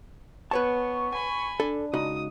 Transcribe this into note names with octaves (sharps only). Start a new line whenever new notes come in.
B3 B4 C#5 A5 C#6
G#5 B5
D4 A4
C#2 D#4 F#4 D#6